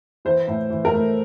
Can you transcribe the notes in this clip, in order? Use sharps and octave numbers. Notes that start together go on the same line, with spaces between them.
E3 C5
A2
E3
A#4
A3